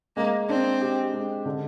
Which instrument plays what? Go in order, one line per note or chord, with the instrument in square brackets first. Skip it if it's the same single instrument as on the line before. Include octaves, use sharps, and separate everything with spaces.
[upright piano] G#3 [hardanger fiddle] A#3
[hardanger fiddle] C4 [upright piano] D4
[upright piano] G4
G#3
D3